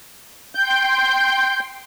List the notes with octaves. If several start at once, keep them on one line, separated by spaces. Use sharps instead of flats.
G5 C6 G6